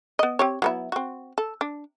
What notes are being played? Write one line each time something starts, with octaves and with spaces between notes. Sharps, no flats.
B3 D#5
C4 G4 C#5
F#3 B3 E4
C4 F#4
A4
D4